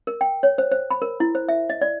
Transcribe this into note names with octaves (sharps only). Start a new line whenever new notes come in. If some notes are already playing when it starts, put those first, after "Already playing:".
A#4
G5
C#5
C5
C5
B5
A#4
E4
C5
E5
D#5
D5